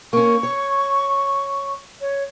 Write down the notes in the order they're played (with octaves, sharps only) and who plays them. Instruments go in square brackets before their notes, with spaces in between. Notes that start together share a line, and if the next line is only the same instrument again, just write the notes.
[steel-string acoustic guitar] A#3 C#4 [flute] C#6
[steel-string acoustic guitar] C#5
[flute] C#5